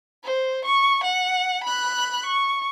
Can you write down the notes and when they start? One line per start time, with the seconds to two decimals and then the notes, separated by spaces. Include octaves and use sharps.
0.24 C5
0.65 C#6
1.04 F#5
1.64 B5 F#6
2.26 C#6